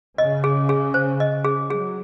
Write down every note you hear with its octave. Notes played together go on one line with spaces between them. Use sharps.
C#3 D#5
G#4
G#4
C5
D#5
G#4
F#3 G#4